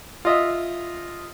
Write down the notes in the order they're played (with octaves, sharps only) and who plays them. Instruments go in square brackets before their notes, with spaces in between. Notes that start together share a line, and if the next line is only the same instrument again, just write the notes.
[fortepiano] F4 D#5 E5